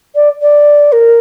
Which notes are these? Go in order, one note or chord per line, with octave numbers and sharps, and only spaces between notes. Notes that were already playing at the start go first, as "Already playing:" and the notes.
D5
D5
A#4